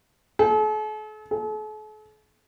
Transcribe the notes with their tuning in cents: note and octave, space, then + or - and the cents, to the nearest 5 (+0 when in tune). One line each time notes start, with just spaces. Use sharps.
A4 -45
A4 -45